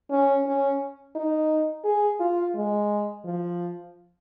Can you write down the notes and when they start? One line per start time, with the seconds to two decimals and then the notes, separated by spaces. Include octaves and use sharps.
0.11 C#4
0.46 C#4
1.16 D#4
1.85 G#4
2.20 F4
2.55 G#3
3.25 F3